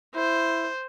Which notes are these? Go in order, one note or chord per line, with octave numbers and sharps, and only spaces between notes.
E4 C5